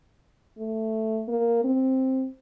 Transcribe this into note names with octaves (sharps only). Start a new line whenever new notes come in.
A3
A#3
C4